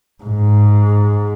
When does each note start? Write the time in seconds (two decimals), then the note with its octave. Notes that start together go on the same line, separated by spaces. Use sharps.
0.24 G#2